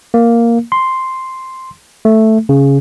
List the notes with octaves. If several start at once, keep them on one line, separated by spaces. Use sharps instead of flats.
A#3
C6
A3
C#3